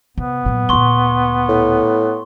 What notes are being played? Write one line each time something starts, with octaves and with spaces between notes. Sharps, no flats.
C3 B3
A#2 F#3
D2 A#2 C6 C#6 G7
A2